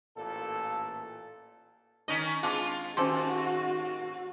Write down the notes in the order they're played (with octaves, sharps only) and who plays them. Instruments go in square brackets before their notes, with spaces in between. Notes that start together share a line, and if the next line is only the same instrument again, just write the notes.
[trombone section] A1 A#2 A4
[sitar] D#3 C#4 D#4 [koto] D#5
[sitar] G#3 F4 [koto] C4 D4
[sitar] D#2 [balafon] C#4 C5 C6 [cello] F#4 [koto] G4 A4